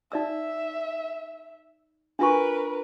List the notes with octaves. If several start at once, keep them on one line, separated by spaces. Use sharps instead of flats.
D#4 D5 E5 E6
D4 F4 A#4 B4 C#6